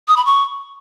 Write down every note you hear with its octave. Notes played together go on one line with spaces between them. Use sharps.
D#6
B5
C#6